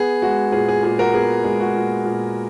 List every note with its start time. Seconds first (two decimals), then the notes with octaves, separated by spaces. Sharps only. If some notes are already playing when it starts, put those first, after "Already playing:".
Already playing: B3 G#4
0.22 G#3 F#4
0.52 A#2 G#4
0.68 G#4
0.83 A#2 G#4
0.99 F#4 A#4
1.14 B3 G#4
1.44 G#3 G#4
1.60 F#4
1.75 A#2
2.05 A#2